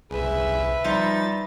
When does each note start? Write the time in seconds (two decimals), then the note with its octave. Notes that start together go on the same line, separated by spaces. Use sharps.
0.11 C2 G#4 B4 E5
0.84 F3 G3 D#4 A6